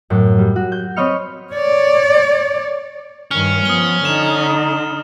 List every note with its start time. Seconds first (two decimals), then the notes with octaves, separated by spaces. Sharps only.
0.10 F#2 A2
0.38 G3
0.56 F#4
0.72 G6
0.96 C4 C#5 D#5 B5 F6 C#7
1.54 C#5 D5
3.31 G2 D#3 C#4 F6
3.65 F3 B3 D#6 G7
4.05 D3 D#4 E7